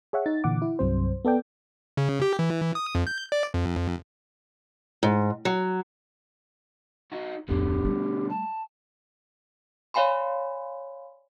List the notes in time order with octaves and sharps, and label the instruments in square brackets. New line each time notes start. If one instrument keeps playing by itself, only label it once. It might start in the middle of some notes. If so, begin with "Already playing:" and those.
[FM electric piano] G#4 C#5 E5 F#5
D#4 A6
A#2 D3 E3 F#5 D6
E4
C2 G2 F#3 C4 C5
B3 A4 D5 G5
[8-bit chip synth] C#3
G4
E3
D#6
F2
G6
D5
F2
[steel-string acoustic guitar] G#2
F#3
[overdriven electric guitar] D#4 F#4
[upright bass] D1 F2 [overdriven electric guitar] B2 D3 [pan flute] G4
[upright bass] G3 A3
[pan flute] A5
[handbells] C#5 D5 F5 G#5 B5 C6